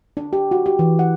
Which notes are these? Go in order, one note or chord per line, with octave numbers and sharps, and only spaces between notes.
D4
G4
F#4
G4
E3
F#5